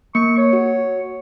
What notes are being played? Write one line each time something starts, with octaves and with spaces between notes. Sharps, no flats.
A#3 C#6
C#5
F#4